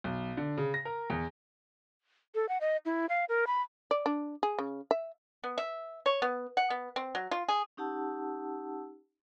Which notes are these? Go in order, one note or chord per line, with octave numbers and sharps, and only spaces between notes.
B1
D3
C#3
A#6
A#4
E2
A4
F#5
D#5
E4
F5
A#4
B5
D5
D4
G#4
C#3
E5
B3
E5
C#5
B3
F#5
B3
C4
F#3
F4
G#4
C#4 D#4 G4 F#5 A5 E6